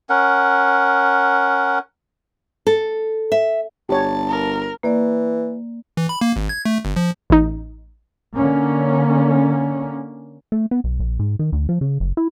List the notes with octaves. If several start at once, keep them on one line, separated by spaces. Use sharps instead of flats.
C#4 A#4 F#5
A4
E5
G1 G4 C#5 A5
A#4
E3 A#3 D5
E3
B5
A#3
G#1
G#6
A3
G1
F3
A1 D#4
D3 A#3 C#4
A3
B3
B1
A#1
G#2
D#3
D2
F3
C#3
F#1
E4